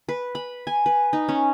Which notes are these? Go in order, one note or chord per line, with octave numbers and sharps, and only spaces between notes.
B4
B5
G#5
B4
D#4
C#4